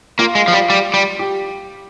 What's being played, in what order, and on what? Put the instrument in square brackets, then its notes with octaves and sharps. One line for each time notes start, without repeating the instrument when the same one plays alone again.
[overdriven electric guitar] A#3 [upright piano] F4
[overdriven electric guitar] G#3
F3
G3
G3
G3
[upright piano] G4